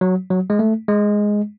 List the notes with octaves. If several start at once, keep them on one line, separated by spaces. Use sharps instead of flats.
F#3
F#3
G#3
A3
G#3